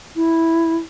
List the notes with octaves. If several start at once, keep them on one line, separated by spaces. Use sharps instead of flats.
E4